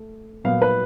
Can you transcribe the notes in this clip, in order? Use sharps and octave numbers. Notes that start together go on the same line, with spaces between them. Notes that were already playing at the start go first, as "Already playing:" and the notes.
Already playing: A3
A#2 F#3 B3 F5
B4